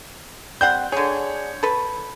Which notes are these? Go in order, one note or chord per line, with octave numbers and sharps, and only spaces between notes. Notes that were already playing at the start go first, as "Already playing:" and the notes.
G3 C4 F#5 G6
D3 G#4 C#5
A4 B4